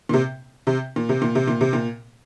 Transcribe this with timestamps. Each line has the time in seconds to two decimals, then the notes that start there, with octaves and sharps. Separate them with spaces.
0.09 A#2
0.13 C3
0.67 C3
0.96 A#2
1.09 C3
1.22 A#2
1.35 C3
1.48 A#2
1.61 C3
1.73 A#2